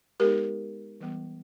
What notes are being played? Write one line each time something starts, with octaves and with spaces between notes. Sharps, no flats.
G#3 B3 D#4 G4 A#4
E3 G3 B3